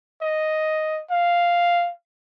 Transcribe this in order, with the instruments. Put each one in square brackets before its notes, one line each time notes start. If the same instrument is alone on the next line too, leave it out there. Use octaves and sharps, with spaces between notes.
[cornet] D#5
F5